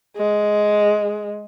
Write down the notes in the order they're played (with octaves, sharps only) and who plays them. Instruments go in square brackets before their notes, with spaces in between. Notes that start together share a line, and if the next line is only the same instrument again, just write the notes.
[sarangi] G#3